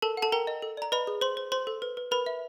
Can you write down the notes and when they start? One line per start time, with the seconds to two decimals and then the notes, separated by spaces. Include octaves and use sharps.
0.02 A4 A#4 A5
0.17 F#5
0.22 A4 A5
0.32 A#4 G5 A#5
0.47 D#5
0.62 A4
0.77 D5 A#5
0.92 B4 D#5 B5
1.07 G#4
1.21 C5 C6
1.37 C5
1.52 C5 C6
1.67 A4
1.82 B4
1.97 B4
2.11 A#4 B4 B5
2.26 E5